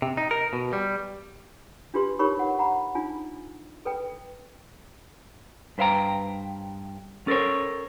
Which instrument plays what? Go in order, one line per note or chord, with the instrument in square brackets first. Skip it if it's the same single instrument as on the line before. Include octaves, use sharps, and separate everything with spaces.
[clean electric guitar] C3
D#4
A#4
B2
G3
[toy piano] D4 F4 G4 B4 C6
D#4 G4 A#4 C#5 B5 C#6
F#5
F#5 A#5 B5
D4 D#4 F4 G#5
A4 B4 G5
[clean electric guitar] G2 B4 C5 F5 G5 A#5
C#4 A4 A#4 C5 C#5